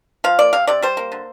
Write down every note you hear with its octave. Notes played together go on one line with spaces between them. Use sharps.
F3 F5
A#3 D5
C3 F5
C3 D5
G3 C5
A#3
D3